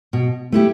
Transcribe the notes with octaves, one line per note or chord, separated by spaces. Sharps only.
B2
A3 E4 G4